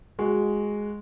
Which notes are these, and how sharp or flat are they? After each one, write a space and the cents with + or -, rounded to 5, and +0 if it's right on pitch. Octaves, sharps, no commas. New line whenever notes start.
G#3 +0 F#4 +0